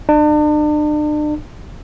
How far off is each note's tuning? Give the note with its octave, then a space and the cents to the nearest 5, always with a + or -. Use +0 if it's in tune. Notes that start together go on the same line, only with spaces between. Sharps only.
D4 +40